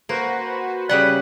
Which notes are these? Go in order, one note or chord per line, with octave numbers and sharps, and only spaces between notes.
A#3 F#4 B4 C5
C#3 G3 B4 D5 F#5